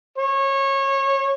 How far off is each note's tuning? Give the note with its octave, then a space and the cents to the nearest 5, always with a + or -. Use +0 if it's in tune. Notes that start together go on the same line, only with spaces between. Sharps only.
C#5 -25